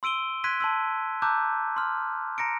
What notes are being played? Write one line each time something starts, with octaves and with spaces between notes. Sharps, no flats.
C6 E6 D7 D#7 G7
C6 F#6 G#6 B6 D#7
A5 C6 E6
A5 A#5 D6 E6 F#6 G6
C6 F6
A#5 A#6 C#7 D7